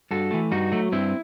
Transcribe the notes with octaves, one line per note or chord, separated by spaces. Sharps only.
G2 F#4 A4
E3 A3
G2 D#4 F#4
F#3 A3
G2 C4 E4